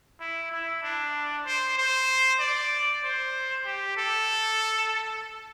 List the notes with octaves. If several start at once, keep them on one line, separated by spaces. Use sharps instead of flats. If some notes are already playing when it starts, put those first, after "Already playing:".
E4
E4
D4
C5
C5
D5
C5
G4
A4